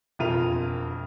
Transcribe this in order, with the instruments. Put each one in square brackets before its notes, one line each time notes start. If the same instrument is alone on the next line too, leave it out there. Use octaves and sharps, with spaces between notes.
[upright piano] E1 F2 F4 A#4 D#7 F7